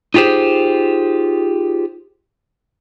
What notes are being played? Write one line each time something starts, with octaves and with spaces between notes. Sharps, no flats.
D#4 F4 G4 G#4 C5